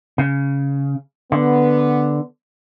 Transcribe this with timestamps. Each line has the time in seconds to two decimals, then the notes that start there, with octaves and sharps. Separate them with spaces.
0.18 C#3
1.32 D3 B3